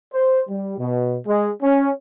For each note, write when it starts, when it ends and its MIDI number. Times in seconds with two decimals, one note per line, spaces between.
0.13 0.42 72
0.49 0.73 55
0.78 1.16 47
1.26 1.50 56
1.62 1.90 61